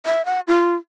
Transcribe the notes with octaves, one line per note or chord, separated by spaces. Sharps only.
E5
F#5
F4